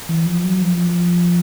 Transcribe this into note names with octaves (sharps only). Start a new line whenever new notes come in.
E3
F3
F#3
F3